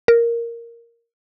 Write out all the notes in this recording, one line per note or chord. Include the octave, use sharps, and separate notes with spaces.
A#4